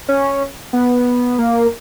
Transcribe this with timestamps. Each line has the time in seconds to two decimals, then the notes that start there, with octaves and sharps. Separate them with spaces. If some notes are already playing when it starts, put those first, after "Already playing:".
0.08 C#4
0.73 B3
1.39 A#3